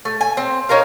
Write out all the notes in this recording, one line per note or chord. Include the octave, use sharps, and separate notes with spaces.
A3
G#5
C4
C#4 D#4 A#4 F5